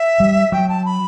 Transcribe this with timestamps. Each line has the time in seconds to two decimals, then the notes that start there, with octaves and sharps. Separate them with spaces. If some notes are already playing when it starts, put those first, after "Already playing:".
Already playing: E5
0.20 G3
0.52 F#3 G5
0.69 A5
0.85 B5